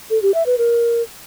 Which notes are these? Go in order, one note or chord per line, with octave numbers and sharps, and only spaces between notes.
A4
G4
E5
B4
A#4